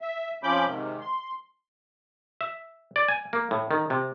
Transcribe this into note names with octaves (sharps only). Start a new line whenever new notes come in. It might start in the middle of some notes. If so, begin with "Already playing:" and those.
E5
F2 F3 C#4 B5 D6 G6
G#2 C3 D#3
C6
E5
D5
G#5
A#3
A2
D#3
C3